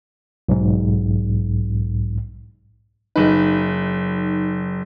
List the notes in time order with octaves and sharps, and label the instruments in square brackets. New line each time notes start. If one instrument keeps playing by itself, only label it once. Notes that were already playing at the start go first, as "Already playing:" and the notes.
[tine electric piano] B1 G#2
[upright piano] F#1 B4 [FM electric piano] D#4